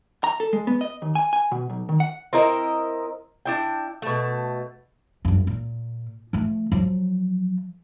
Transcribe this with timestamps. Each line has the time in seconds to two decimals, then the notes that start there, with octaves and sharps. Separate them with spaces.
0.24 A#5
0.40 A4
0.53 G#3
0.67 B3
0.81 D#5
1.02 D#2
1.15 G#5
1.33 G#5
1.52 B2
1.70 B1
1.89 D#3
2.00 F#5
2.33 C4 E4 A#4 D#5
3.46 D4 E4 G5
4.02 B2 A3
5.25 G1 F#2
5.47 A#2
6.33 F3 A3
6.72 F3 F#3